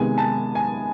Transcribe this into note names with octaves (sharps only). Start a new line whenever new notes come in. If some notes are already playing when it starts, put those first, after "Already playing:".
Already playing: C3 D#3 G#3 B3 G#5
A5
G#5